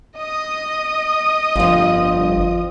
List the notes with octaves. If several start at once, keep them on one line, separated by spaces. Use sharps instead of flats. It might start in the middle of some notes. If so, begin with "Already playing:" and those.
D#5 D#6
G1 F2 F3